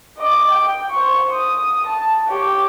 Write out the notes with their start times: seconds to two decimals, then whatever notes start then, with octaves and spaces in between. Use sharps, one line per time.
0.19 D#5 D6
0.52 G5
0.91 C5 C#6
1.33 D#6
1.87 A5
2.29 G4 C#5